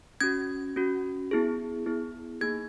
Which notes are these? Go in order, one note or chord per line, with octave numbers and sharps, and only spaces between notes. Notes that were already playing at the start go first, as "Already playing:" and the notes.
C#4 F#4 G#6
C#4 F#4
B3 E4 G#4
B3 E4 G#4
A#3 D#4 G#4 G#6